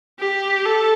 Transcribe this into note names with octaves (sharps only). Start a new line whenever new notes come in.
G4
A4